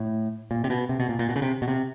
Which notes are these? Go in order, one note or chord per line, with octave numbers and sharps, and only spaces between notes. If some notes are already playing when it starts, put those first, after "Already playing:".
Already playing: A2
A#2
C3
B2
C3
B2
A#2
A#2
B2
C#3
C3
B2
C3